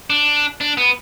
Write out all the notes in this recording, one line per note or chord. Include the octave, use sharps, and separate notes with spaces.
D4
D4
B3